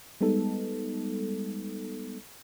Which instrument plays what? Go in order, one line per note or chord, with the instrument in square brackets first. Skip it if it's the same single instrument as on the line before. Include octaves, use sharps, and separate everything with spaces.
[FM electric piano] G3 G#3 B3 D#4 A4